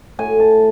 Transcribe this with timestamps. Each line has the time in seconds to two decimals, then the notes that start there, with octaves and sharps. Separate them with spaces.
0.19 A2 G#5
0.40 A5